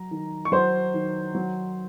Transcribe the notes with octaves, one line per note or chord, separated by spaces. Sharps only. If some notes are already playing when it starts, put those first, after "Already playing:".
Already playing: F#3 A#5
D#3
C#6
F#3 C5 C6
D#3
F#3